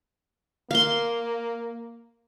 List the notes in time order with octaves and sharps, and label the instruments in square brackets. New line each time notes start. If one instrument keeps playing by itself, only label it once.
[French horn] A#3 [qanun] F5 C6